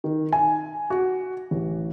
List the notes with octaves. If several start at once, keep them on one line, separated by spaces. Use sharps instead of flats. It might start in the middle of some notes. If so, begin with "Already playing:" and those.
D#3
G#5
F#4
A1